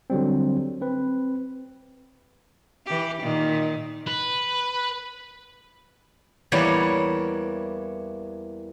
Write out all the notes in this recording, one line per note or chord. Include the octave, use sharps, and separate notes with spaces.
D3 F#3 G3 C4
C4 B4
E3 G4
A#2 D#3
B4
E2 E3 G3 A#3 C#5 D5